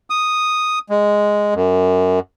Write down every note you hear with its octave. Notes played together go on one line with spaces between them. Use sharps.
D#6
G#3
F#2